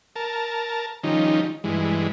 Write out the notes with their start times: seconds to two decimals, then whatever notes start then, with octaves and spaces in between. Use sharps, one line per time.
0.16 A#4 A5
1.04 D#3 F3 G3 C#4 D#4
1.64 G2 E3 G#3